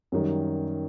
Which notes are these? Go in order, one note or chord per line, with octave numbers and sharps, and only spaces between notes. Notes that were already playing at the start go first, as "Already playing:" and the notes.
F#2 D#3 G3